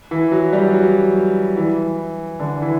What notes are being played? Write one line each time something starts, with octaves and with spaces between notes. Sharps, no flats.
E3
F#3
G3
F#3
E3
D3
E3